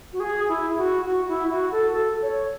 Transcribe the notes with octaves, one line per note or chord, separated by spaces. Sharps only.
F#4
G#4
E4
F#4
F#4
E4
F#4
A4
A4
C#5